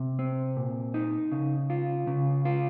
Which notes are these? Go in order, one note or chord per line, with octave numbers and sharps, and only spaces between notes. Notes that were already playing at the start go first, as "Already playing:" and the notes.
Already playing: C3
C4
A#2
D#4
C#3
F4
C#3
F4